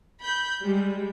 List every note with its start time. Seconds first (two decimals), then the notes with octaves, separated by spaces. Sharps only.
0.21 B5 G6
0.64 G3 G#3